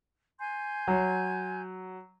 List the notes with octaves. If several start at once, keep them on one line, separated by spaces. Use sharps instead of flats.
G#5 C6 G6
F#3